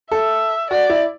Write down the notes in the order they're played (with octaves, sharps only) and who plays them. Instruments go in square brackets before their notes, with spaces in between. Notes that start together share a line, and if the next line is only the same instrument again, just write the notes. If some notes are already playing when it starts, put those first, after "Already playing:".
[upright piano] A4 [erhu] E5
[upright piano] F#4 [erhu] D5
[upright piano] E4